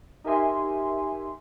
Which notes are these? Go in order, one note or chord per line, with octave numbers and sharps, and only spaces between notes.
D#4 G4 A#4 E5 G#5 C6